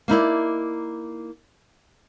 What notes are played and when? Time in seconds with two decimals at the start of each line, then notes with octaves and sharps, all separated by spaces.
0.08 A#3 D#4 E4 D5